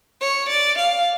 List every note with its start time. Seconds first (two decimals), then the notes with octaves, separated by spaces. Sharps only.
0.21 C#5
0.49 D5
0.79 F5